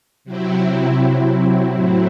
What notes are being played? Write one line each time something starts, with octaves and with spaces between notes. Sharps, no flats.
C3 F#3 C4 E4
A2 F#3 C4 E4